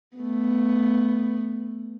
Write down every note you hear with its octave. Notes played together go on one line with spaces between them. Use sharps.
A3 B3